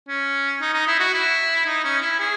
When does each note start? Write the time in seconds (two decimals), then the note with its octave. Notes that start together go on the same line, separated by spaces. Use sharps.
0.08 C#4
0.61 D#4
0.74 D#4
0.87 E4
1.00 F#4
1.14 E4
1.66 D#4
1.85 C#4
2.02 E4
2.20 G#4